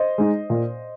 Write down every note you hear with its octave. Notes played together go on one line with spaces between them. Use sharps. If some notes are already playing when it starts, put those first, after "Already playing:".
Already playing: C5 D#5
G#3 D#4
A#2